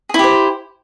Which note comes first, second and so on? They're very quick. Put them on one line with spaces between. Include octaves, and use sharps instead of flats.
G#4 E4 G4 C5